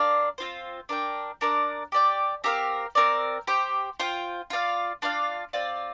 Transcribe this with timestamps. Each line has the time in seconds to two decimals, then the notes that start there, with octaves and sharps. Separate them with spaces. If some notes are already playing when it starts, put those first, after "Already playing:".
Already playing: D4 A#4 D5 F5
0.38 C4 F4 C5
0.89 D4 A#4 G5
1.41 D4 A#4 D5
1.92 G4 D5 G5
2.44 C4 G4 A#4 F5
2.95 C4 A#4 D5
3.47 G4 C5 G5
4.00 F4 C5 G5
4.50 F4 D5 F5
5.02 D4 F4 D5 F5
5.53 C4 F4 D5